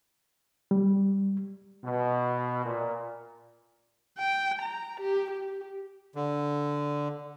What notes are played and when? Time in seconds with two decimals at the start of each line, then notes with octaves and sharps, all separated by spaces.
0.71 G3
1.84 B2
2.65 A#2
4.18 G5
4.62 A#5
5.00 G4
5.31 G4
6.15 D3